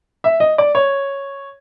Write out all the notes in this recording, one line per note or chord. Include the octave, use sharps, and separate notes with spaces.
E5
D#5
D5
C#5